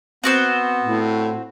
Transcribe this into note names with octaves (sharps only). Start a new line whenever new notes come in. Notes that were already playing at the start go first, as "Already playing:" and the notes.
B3 C4 F#4 C5
A2